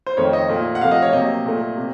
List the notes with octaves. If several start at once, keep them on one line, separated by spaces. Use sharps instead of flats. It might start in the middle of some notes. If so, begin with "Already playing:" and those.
C5
F2 D#3 A3 C#5
D#5
A#2 A3
F#5
C3 F3 A3 F5
D#5
C#5
C3 F#3 A#3 D#5
A#2 A3
C3